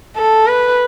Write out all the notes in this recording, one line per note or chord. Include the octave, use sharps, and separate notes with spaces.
A4
B4